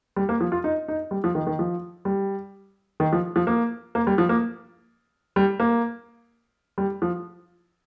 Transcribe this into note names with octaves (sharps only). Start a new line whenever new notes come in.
G3
A#3
F3
F4
D#4
D#4
G3
F3
D#3
D#3
F3
G3
D#3
F3
F3
A#3
A#3
G3
F3
A#3
G3
A#3
G3
F3